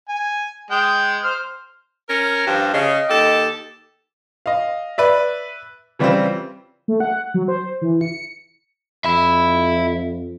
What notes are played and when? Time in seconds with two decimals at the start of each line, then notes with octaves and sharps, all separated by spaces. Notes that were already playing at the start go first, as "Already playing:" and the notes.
0.09 G#5
0.71 G#3 G5
1.23 C5 F6
2.09 C#4 A#4
2.46 G2 F3
2.74 C#3 D#5
3.09 D#2 G4 A4
4.46 D#5 F5
4.98 B4 D5 E5
5.99 C#3 E3 G3 C4 F4 C5
6.88 A3
7.00 F#5
7.34 F#3
7.48 C5
7.82 E3
8.01 C#7
9.05 F2 E5 B5